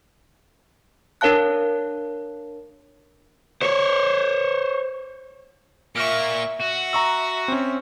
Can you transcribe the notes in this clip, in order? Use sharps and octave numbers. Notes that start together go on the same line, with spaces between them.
D4 A#4 C#5 F5 A5 F#6
C5 C#5
A#2 A#3 E5 C#6 F6 D7
F#4 E5
A#5 C#6 E6
C4 C#4